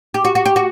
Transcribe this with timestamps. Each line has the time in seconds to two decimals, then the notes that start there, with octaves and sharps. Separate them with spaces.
0.14 G4
0.25 F#4
0.35 F#4
0.46 G4
0.56 F#4